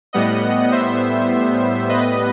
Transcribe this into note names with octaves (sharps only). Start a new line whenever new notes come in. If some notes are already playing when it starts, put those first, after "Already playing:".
A2 G3 B3 D#5 F#5
C5 E5
B4 D#5